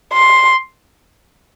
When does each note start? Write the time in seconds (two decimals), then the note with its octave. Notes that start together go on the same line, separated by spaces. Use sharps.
0.13 C6